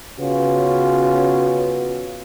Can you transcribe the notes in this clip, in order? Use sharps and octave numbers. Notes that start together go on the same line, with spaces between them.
C#3 B3 C#4 F4 F#4 B4